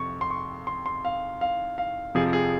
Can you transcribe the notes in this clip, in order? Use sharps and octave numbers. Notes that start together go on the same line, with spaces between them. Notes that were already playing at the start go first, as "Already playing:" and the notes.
Already playing: F2 C3 C#6
C6
C#6
C6
C6
F5
F5
F5
F2 C3 F3 G#4
G#4